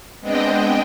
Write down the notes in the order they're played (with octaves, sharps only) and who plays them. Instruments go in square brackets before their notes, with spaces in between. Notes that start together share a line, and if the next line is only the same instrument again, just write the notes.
[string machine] G#3 B3 C4 D4 D#5 G5